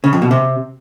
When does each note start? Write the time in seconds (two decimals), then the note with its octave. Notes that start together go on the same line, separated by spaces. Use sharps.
0.04 C#3
0.13 F2
0.22 B2
0.31 C3